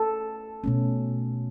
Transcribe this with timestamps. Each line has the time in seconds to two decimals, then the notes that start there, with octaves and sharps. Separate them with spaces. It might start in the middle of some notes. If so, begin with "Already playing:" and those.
Already playing: A4
0.64 B2 A3 C#4